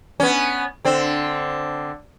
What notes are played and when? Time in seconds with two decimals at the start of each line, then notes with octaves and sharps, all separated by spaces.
0.20 B3 C#4
0.85 D3 C4